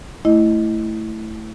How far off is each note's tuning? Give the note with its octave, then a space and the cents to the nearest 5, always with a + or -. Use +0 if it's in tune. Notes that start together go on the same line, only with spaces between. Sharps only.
A3 +0 E4 -5 D#5 +0